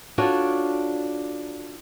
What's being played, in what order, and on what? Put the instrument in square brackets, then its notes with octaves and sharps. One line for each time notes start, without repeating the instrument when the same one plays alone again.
[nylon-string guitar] D4 F4 F#4 A4 C#5